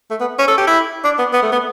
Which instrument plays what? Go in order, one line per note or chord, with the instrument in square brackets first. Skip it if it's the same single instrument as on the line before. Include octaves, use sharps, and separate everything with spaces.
[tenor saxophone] A3
B3
C#4
A4
G4
E4
D4
B3
B3
A3
B3